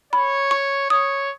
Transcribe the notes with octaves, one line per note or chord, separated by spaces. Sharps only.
C#5 B5
C#6
C#5 D#6